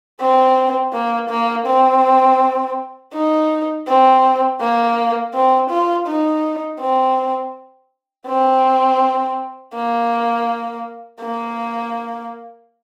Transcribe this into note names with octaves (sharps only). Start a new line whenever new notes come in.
C4
A#3
A#3
C4
D#4
C4
A#3
C4
F4
D#4
C4
C4
A#3
A#3